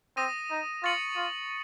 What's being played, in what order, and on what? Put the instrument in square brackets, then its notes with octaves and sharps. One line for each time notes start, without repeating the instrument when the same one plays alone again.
[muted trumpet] C4 [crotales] D#6 A#6 D#7
[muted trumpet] D#4
[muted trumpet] F4 [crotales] C#6 A6 C#7 F#7
[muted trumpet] F4